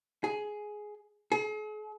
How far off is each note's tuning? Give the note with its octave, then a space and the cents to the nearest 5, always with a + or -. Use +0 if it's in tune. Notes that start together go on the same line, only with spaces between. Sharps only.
G#4 +10
G#4 +45